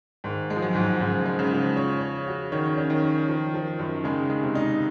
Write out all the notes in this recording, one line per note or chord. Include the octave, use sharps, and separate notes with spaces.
G#2 D#3
G#3
F3
F#3
G#2
G#2 C#3
G#3
C#3
F3
C#5
C#5
F#4
D#3 C#5
C#4
D#3
C#5
F3
F3
F#2
C#3 G#3
G#3
C3
D#4